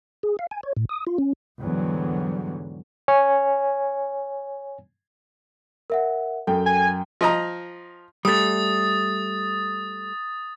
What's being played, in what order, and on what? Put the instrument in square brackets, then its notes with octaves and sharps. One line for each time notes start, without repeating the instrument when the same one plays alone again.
[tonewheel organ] G#4
F5
G#5
C#5
A2
D#6
F4
C#4
[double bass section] E2 G#2 D3 F#3 G3
[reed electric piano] C#5 G#5
[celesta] A#4 E5 F#5
[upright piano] F#2 G5 [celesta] A4
[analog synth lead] G#5
[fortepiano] F3 D#5 A#5
[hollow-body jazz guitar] G3 A3 [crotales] D#6 A6